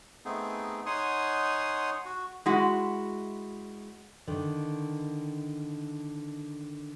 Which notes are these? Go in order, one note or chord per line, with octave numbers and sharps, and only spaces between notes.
A3 B3 C4 D#4 G#4
D#4 C#5 F#5 G#5 C6 D#6
F#4
G#3 E4 F#4
D3 D#3